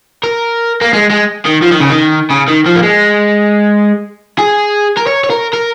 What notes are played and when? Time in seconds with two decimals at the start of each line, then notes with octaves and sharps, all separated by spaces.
0.24 A#4
0.81 A#3
0.93 G#3
1.10 G#3
1.45 D#3
1.62 F3
1.72 D#3
1.80 C#3
1.90 D#3
2.31 C#3
2.48 D#3
2.66 F3
2.76 A#3
2.83 G#3
4.38 G#4
4.98 A#4
5.07 C#5
5.24 C#5
5.30 A#4
5.53 A#4